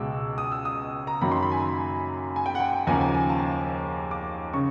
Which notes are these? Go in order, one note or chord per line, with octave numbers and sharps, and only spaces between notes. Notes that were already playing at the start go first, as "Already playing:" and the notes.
Already playing: C#2 B2 G#3 D6 E6
D#6
E6
D#6
A#5
F#2 D#3 F#3 A#3 B5
C6
B5
G#5
G#5
G5
F#5
G5
G5
D#2 C#3 F3 A#3 G#5
G#5
G#5
A5
D6
C#3 C#6